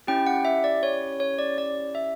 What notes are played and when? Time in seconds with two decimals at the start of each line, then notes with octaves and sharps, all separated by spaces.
0.07 C#4 E4 G4 G5
0.27 F#5
0.45 E5
0.64 D5
0.83 C#5
1.20 C#5
1.39 D5
1.58 D5
1.95 E5